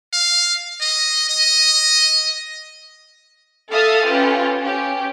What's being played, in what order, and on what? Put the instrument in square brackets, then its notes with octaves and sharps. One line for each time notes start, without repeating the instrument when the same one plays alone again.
[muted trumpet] F5
D#5
D#5
[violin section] A4 E5 F5 D#6 F6 A6
C#4 F4 G4 B4
C#4 G4